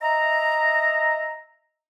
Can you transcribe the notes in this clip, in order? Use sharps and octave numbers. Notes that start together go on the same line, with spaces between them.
D#5 E5 A#5